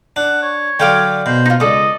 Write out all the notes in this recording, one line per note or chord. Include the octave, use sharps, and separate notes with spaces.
D4 F#5
C#5
D3 F#3 D5 F5 G5
B2 C5
D#4 F4
C#2 A4 D5 D#5